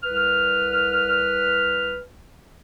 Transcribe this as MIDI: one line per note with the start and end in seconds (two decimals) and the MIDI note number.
0.03 2.02 36
0.03 2.02 71
0.03 2.02 89